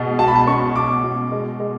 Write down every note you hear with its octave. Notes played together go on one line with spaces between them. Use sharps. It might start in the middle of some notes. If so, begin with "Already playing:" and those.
Already playing: B2 G#3
F#4 A5
B5
A5
C#4 C#6
B2 D6
F#4
G#3
G#3